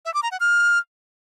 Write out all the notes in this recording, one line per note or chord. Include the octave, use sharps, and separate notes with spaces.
E5
D6
A#5
F#5
F6